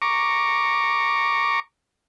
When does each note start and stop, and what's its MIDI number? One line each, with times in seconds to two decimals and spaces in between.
0.02 1.60 82
0.02 1.60 85
0.02 1.60 86